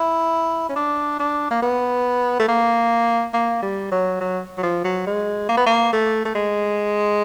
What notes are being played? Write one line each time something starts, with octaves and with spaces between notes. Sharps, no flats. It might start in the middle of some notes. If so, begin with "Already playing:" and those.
Already playing: E4
C#4
D4
D4
A#3
B3
A3
A#3
A#3
G3
F#3
F#3
F#3
F3
F#3
G#3
A#3
B3
A#3
A3
A3
G#3